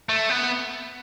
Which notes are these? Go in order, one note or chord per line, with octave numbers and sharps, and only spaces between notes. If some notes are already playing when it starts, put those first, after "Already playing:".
A3
B3